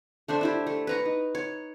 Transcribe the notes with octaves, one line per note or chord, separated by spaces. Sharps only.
A3 D4 C5 E5
D4 E4 G4
A3
B4 A#5 C#6
D#4
C#5